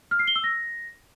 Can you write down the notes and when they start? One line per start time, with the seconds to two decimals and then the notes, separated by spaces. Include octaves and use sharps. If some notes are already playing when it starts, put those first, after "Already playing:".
0.11 F6
0.19 C7
0.28 G7
0.36 E6
0.44 A#6